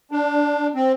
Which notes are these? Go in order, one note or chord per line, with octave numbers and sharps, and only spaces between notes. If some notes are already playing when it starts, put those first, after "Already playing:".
D4
C4